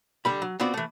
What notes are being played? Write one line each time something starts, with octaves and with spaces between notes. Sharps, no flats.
D3 G3 B5
F#3
B3 C4 F4 F#4 C5 D5
E3 A3